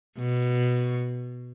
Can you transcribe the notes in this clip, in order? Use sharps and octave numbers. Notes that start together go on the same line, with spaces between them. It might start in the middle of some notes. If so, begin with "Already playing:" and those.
B2